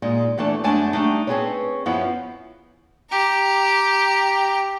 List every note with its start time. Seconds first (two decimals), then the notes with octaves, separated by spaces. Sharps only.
0.02 A#2 G#3 D#4
0.38 E2 E3 A3 D4 A4 A5
0.64 F#2 G#3 A3 D4 G#5 A5
0.93 G3 A3 D4 D#4
1.27 C4 C#4 G#4 A4 B4 C#5
1.86 F#2 F3 F#3 B3 C#4 E4
3.11 G4 A#5